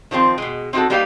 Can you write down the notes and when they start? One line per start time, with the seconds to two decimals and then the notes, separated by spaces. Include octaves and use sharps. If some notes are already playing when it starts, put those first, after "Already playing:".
0.11 D#3 F3 G3 C4
0.38 B2 G#3
0.73 C4 D#4 E4 F#4 A4
0.90 G3 A#3 D#4 G4 B4 F5